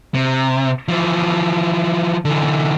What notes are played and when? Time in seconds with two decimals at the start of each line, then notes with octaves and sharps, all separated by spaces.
0.14 C3
0.88 E3 F3
2.25 D3 E3